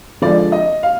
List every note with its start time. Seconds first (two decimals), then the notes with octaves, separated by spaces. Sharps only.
0.22 D3 F3 G#3 D5
0.52 D#5
0.83 F5